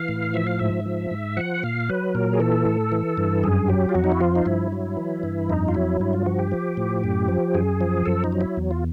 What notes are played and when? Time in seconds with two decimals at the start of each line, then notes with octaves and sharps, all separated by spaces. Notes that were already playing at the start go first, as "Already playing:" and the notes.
Already playing: E3 F5
0.09 A2
0.34 F3 E5
0.47 F5
0.59 G#2 E5
0.86 F3
1.11 G#2
1.37 F3 F#5
1.63 A#2 F5
1.89 F#3 B4
2.15 A#2 A#4
2.33 G#4
2.40 E3 A4
2.66 A2
2.92 E3
3.18 G2
3.43 F#2 G#4
3.68 F#3 G4
3.89 F4
3.95 F2 F#4
4.04 D#4
4.12 E4
4.20 F3 F4
4.36 D#4
4.45 G2 E4
4.72 F#3
4.97 E3
5.23 G2
5.49 F2 D#4
5.68 F4
5.75 F#3 E4
6.00 G2 E4
6.13 F4
6.26 F3 F#4
6.39 G4
6.52 F3
6.77 A2
7.04 F#2
7.28 F3
7.55 F#2 G#4
7.81 F3
8.06 F#2 A4
8.24 D#4
8.32 F#3
8.41 E4
8.57 E2
8.71 F4